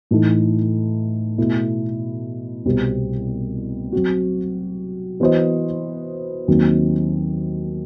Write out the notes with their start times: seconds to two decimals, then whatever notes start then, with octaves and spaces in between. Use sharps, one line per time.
0.11 A2 E3 A3 D#4
1.38 B2 A3 E4
2.65 C2 B2 G3 C4
3.92 F#3 C4 F#4
5.20 E3 B3 F#4 C5 D#5
6.48 D#2 D#3 F#3 C4